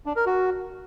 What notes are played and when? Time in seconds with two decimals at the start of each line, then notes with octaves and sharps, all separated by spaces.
0.06 D4
0.16 A#4
0.26 F#4